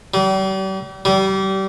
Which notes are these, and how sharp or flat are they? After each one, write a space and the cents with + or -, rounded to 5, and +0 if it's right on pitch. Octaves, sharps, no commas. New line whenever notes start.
G3 -40
G3 -30